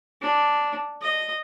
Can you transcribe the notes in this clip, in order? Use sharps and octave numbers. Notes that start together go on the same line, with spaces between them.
D4
D#5